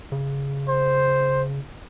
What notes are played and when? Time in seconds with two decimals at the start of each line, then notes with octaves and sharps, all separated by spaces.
0.12 C#3
0.69 C5